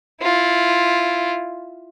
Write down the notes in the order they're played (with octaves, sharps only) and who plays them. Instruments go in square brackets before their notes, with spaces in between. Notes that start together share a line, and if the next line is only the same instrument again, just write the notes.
[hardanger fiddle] E4 F4